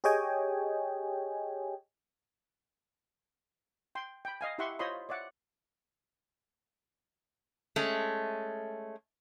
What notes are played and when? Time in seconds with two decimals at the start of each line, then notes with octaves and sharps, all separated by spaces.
0.04 G4 G#4 C#5 D#5 G5 G#5
3.95 G5 C6
4.25 G5 B5
4.41 D#5 F5 G#5
4.58 E4 G4 E5 F#5 C6 C#6
4.79 F4 C5 C#5 D#5 B5 C6
5.09 C#5 D5 E5 F#5
7.76 G#3 A3 C#4